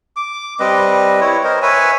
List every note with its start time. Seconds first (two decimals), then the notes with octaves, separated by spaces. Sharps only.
0.16 D6
0.60 G3 C4 B4 D#5
1.21 E4 C#5
1.44 A#4 C5 D#5
1.62 B4 C#5 E5 G#5